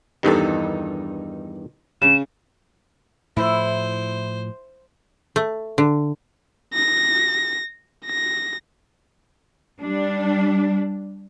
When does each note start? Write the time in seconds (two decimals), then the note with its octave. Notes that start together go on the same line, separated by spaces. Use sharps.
0.23 E2 G2 D#3 G3 D#4 A4
2.02 C#3 E7
3.37 A2 F3 E4 C5
5.36 A3
5.78 D3
6.74 A#6
8.06 A#6
9.81 G3 D4